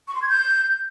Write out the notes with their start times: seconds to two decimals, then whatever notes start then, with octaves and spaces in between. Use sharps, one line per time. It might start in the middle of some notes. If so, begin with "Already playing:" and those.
0.08 C#6
0.15 C6
0.22 G#6
0.29 G6